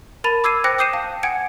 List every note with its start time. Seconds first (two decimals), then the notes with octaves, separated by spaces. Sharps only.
0.24 A#4 A5 B5 A6 D#7 F7
0.44 D6 E6 G#6 C7 D#7
0.64 C5 G5 D6 F#6 A#6 C#7
0.78 D6 D#6 G6 C7 D#7 E7
0.93 F5 A5
1.23 F#5 G#5 G#6 C#7 D7